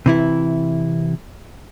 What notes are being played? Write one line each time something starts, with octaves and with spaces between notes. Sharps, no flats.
C3 E3 E4